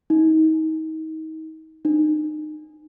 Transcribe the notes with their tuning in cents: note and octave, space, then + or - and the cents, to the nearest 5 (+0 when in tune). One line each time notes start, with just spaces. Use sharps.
D#4 +30
D#4 -30